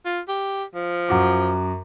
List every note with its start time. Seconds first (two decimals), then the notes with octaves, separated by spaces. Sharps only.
0.05 F4
0.28 G4
0.75 F3
1.09 F#2 F#4 D6